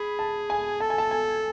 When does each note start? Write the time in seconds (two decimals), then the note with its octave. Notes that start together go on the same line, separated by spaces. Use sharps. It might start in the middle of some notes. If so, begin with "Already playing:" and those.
Already playing: G#4 B5
0.19 A5
0.50 G#5
0.80 A4 A5
0.90 G#5
0.98 A5
1.11 G#5